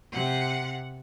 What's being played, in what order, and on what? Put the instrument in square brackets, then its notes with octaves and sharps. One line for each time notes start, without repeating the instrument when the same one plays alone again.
[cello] C3 F#5